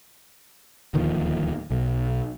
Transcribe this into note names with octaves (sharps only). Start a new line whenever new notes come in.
D1 D#2 D#3 F3
B1